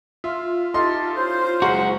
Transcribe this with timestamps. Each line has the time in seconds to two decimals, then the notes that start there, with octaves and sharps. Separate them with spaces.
0.24 F4 E5
0.74 D#4 E4 G4 A4 C6
1.16 C#4 E4 C5
1.62 F#1 G#3 F#4 A#5